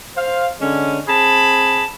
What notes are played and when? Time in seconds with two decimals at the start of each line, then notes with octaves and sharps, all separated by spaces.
0.16 C5 F5
0.60 D3 G#3 C#4
1.08 C4 G#4 A5 B5